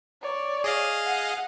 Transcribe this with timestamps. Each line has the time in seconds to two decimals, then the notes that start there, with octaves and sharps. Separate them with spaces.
0.22 C#5 D5
0.64 G#4 D#5 F5
1.06 F#5